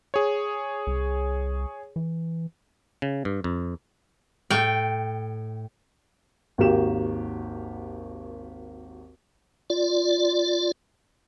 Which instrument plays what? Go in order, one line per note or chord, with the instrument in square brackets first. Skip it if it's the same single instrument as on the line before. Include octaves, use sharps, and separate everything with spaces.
[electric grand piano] G#4 C#5
[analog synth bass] C2
E3
[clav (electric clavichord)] C#3
G2
F2
[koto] A2 G5
[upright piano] G#1 D#2 A#3 F#4 G4 E7
[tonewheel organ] F4 D5